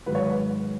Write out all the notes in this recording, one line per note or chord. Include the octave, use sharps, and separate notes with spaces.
G#2 D#3 F#3 B4
C#5
B4